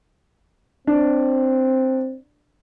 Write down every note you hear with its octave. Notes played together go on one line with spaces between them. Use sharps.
C4 D4